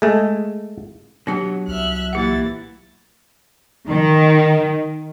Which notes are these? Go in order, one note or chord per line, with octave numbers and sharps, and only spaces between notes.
G#3 A3
B2 F#3 D4 G4
C2 E5 F6 F#6
A#2 E3 G4 F#5 A6
D#3